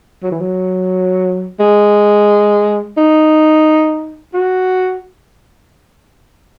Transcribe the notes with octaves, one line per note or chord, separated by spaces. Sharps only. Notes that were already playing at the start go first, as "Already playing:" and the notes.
F#3
E3
F#3
G#3
D#4
F#4